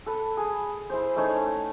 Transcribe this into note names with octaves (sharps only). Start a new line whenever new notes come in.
A4 B4
G#4
E4 G#4 C5
A3 C#4 D#4 C#5